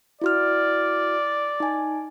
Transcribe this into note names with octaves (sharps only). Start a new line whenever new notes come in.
E4 F#4 D5 F6
D#4 G#5